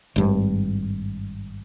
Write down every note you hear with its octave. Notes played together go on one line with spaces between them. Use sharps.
G#1 G2